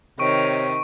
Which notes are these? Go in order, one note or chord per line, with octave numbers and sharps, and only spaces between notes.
C3 D#3 C#5 C#6 D7